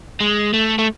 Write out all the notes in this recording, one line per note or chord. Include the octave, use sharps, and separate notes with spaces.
G#3
A3
A3